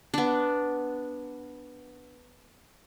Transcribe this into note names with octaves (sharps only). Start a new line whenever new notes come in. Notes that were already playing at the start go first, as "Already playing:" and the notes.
B3 D4